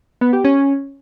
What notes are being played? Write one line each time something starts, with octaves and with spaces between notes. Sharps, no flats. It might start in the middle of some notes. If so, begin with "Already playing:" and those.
B3
G4
C#4